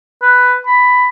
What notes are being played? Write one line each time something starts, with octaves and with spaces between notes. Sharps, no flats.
B4
B5